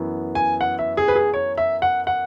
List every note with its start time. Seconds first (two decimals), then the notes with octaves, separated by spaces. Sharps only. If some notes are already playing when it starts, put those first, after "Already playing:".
Already playing: F#2 E3 B3
0.35 G#5
0.61 F#5
0.79 E5
0.97 G#4
1.08 B4
1.15 G#4
1.34 C#5
1.58 E5
1.82 F#5
2.07 F#5